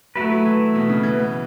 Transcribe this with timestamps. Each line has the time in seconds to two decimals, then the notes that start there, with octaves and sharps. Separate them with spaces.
0.16 F#3 A3 E4 B4
0.31 F#3
0.45 E3
0.75 B2
0.89 C#3
1.03 E3
1.19 B3